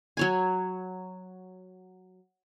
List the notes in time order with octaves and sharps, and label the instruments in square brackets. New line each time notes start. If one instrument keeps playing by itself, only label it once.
[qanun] F#3 C#5 G#5